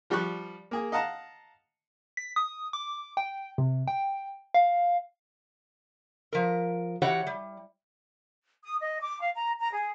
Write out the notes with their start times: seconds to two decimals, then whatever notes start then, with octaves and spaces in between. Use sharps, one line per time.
0.10 F3 G3 G4 C#6 F#6
0.71 A#3 G#4
0.92 D#5 F5 F#5 A5 A#5
2.17 B6
2.36 D#6
2.73 D6
3.17 G5
3.58 C3
3.88 G5
4.54 F5
6.33 F3 A#4
7.02 E3 F#4 G4 C#5 F#5
7.27 G3
8.63 D#6
8.80 D#5
9.01 D6
9.21 F5
9.35 A#5
9.59 A#5
9.72 G#4